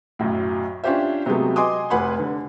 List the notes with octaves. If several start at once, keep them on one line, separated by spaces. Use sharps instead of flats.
B1 F#2 A2
C#4 D4 F4 G4 C5 E5
C3 F#3 G#3 A3 B3
D#5 G#5 C6 D6 D#6
F1 B4 F#5 G#5 B5 C6
D3